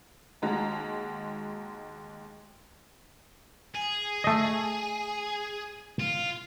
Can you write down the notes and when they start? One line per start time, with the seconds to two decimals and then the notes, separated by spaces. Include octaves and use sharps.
0.42 D#2 G#3 F#4 A#5
3.75 G#4
4.24 A3 D#5
6.00 F4